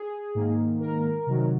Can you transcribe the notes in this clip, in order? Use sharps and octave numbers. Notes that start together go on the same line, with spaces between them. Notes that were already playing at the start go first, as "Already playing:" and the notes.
Already playing: G#4
G#2 D#3 A#3
A#4
C3 D#3 F#3